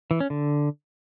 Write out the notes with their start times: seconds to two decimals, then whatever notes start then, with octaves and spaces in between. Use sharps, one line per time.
0.11 E3
0.20 C#4
0.30 D3